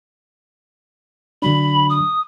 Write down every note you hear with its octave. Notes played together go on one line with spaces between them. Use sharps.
D3 F#3 D4 B5
D#6